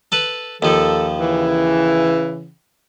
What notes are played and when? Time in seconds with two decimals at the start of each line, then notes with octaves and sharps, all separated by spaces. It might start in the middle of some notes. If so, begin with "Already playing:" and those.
0.12 A4 B4
0.62 D#2 F3 A4
1.19 C#3 E3